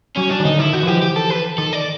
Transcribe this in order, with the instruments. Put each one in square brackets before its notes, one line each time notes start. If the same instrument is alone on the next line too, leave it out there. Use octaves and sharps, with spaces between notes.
[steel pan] F#3 [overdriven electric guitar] C#4
[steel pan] F#3 [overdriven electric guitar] D4
[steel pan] D#3
[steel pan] D3 [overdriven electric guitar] D#4
[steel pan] D#3 [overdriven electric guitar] E4
[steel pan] D#3 [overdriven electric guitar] F#4
[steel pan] F3
[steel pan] E3 [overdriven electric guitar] G4
[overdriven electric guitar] G4
A4
B4
[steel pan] D#3 [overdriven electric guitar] A4
[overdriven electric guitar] D5